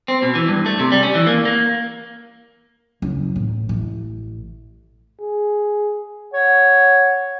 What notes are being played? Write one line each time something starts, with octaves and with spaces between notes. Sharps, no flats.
C4
B2
E3
G2
A3
C3
G3
C#4
E3
A#3
A#3
F#1
A1
A1
G#4
C#5 F#5